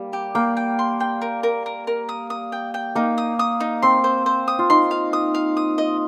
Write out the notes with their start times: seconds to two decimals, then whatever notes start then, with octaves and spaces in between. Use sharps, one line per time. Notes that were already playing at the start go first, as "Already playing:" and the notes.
Already playing: G3 A#3
0.13 G4
0.35 A#3 G5
0.57 G5
0.79 C6
1.01 G5
1.22 A#4
1.43 A#4
1.66 A#4
1.87 A#4
2.09 D#6
2.30 D#6
2.52 G5
2.74 G5
2.95 A#3 D#4
3.18 D#6
3.39 D#6
3.60 D#4
3.82 C4 C6
4.04 C5
4.26 C5
4.48 D#6
4.59 F4
4.70 D#4 C6
4.91 F5
5.13 D#6
5.34 F5
5.57 D#6
5.78 D#5